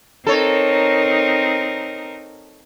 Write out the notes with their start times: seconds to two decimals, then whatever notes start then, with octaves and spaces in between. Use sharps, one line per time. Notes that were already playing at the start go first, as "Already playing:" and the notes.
0.27 C4 D#4 A4 A#4 C#5